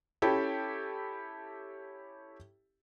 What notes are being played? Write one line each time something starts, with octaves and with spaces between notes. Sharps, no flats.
C#4 E4 G4 A4